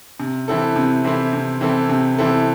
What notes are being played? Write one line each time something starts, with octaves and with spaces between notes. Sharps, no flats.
C3
E3 C4 E4 A4
C3
E3 C4 E4 A4
C3
E3 C4 E4 A4
C3
E3 C4 E4 A4